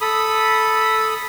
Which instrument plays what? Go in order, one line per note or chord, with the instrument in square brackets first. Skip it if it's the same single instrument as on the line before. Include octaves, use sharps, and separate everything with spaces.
[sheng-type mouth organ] A4 B5 D#6